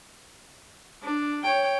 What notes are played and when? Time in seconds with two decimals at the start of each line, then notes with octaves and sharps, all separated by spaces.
1.03 D4
1.44 C#5 G5